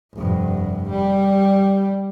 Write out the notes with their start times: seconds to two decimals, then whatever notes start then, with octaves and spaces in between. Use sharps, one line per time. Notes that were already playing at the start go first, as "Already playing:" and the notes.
0.14 F1 G2
0.89 G3